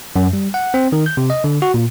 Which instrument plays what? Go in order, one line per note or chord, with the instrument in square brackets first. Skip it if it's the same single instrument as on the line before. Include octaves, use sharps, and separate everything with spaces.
[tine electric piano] F#2
G3
F#5
C4
D#3
G6
C3
D#5
D3
F#4
A#2